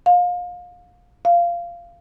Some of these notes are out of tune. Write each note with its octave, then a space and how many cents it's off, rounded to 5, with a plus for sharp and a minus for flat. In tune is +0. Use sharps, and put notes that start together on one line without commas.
F5 +30
F5 -15